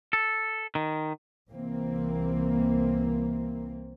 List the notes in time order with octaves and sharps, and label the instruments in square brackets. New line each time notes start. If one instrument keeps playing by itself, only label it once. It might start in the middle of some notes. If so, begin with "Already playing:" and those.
[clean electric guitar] A4
D#3
[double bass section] C2 E3 A#3 C4